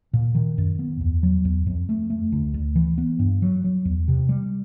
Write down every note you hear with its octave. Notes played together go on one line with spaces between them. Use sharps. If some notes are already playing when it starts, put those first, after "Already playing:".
A#2
D#3
F#2
B3
E2
F#3
E2
F2
A3
A3
D2
D2
E3
B3
G2
F#3
F#3
E2
C3
G3